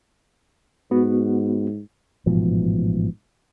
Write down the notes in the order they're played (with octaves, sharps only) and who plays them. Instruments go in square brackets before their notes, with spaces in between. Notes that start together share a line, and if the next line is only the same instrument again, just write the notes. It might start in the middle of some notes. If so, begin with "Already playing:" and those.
[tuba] G#2 [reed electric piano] B3 F#4
[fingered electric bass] A1 G#2 B2 F3